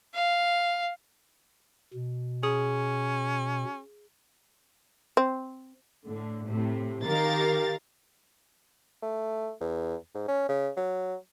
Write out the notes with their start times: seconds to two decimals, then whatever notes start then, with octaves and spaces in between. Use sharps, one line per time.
0.14 F5
1.93 B2
2.43 C#4 G#4 D#6
5.17 C4
6.07 A2 D3
6.46 A2 C3
7.05 D#3 G4 A#4 F5 A#5 A6
9.02 A3
9.61 E2
10.15 G#2
10.28 C#4
10.49 C#3
10.77 F#3